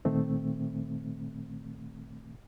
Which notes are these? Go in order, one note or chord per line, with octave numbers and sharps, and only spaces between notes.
A#2 D#3 A3 C4